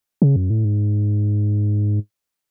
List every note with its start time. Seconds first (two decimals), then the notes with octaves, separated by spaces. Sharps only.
0.22 C#3
0.36 F#2
0.50 A2
0.65 G#2